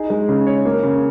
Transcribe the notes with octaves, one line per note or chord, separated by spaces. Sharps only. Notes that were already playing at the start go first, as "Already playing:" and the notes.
Already playing: D#4 G#4
G#3
C#3
C#5
A#3
C#3